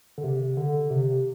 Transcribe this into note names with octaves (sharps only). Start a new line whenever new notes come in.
D3
C3
D3
C3